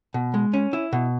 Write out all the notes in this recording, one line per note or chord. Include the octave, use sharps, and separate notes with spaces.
B2
G#3
C#4
E4
B2